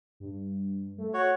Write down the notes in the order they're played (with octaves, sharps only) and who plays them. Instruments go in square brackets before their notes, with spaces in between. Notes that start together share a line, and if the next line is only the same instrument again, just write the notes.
[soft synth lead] G2
A3
[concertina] F#4 C#5